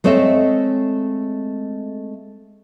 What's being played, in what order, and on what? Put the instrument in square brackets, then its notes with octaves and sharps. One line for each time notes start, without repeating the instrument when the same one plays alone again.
[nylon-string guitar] G#3 A3 C4 C#5 D#5 E5